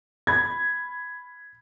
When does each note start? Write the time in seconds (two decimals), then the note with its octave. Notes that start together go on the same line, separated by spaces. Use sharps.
0.27 B5 G#6